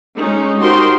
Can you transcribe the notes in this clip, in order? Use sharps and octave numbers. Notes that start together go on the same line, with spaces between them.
G#3 C#4 D#4
D#4 F#4 G4 A#4 C5 C6